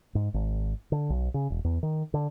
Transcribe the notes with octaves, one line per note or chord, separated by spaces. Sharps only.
G#2
G#1
D3
B1
C#3
E1
E2
D#3
D3